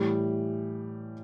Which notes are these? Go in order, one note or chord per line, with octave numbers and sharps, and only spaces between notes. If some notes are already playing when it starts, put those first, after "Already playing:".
Already playing: A2 E3 G3